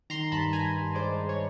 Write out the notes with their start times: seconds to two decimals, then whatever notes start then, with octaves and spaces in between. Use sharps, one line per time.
0.10 D#3 A#5 C6
0.32 G2 A5 B5
0.53 G2 G#5 A#5
0.75 G2
0.95 G#3 C5 D5
1.16 G#3
1.29 C#5